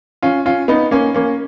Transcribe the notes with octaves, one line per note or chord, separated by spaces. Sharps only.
C#4 F4
C#4 F4
B3 D#4
A#3 C#4
A#3 C#4